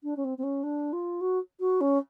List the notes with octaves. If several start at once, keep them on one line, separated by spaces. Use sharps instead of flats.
D4
C#4
C4
C4
C#4
D4
F4
F#4
F#4
C#4